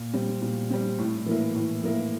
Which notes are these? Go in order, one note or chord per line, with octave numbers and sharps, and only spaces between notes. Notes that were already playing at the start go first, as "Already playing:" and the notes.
Already playing: A#2
G3 C4
A#2
G3 C4
A2
E3 A#3 E4
A2
E3 A#3 E4